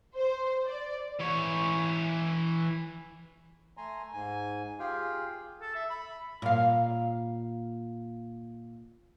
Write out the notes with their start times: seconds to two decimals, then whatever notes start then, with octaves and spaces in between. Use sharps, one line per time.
0.16 C5
0.66 D5
1.20 E3 C#5
3.77 A3 G#5 A#5 C6
4.13 G#2 G#5
4.80 F4 G4 G#4 F5 G5
5.61 A4
5.75 E5
5.90 B5
6.42 A#2 F5